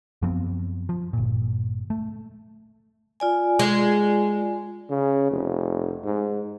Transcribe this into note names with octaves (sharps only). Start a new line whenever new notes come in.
F#2 F3 B3 C4
F3
G1 A#2
A3
F4 D5 G#5
G#3
C#3
F1
G#2